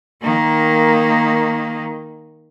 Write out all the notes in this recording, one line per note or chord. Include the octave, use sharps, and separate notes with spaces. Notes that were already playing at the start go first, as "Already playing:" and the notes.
D#3 A#3